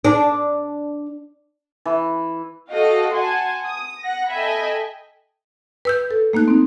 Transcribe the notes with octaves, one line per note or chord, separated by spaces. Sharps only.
D4
E3
F#4 A4 D#5 F5 G5
F#5 G#5 A5 C6
D#6
F#5 A#6
A4 D#5 E5 G5 G#5 B5
B4 E6 G6
A4
A3 A#3 D#4 F#6
C4 D#4